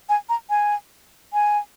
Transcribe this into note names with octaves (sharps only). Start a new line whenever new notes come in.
G#5
A#5
G#5
G#5